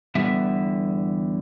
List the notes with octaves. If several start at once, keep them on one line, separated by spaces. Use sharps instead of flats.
E2 D3 G3 B3 E5